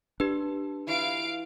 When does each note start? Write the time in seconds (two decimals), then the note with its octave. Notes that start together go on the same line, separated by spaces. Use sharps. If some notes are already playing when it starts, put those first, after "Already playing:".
0.20 D4 G4 A4 B4
0.87 E3 E4 F4 F5 D7